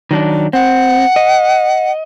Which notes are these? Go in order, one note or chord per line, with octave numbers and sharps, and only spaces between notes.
D#3 F#3 D4
C4 F#5
D#5